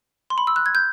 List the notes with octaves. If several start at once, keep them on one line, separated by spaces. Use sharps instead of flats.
C6
B5
E6
F#6
G#6
G6